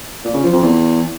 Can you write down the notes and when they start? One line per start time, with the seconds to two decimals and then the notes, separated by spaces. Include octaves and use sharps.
0.24 A#2
0.34 C#3
0.43 F3
0.53 F2
0.63 E2